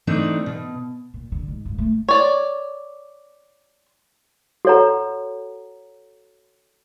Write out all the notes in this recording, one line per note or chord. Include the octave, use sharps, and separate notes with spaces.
E3 A3 C4 D4 D#4
B2
A#2
D3
G#2
G2
A3
C#5 D5
F#4 A4 C#5 F#5 A#5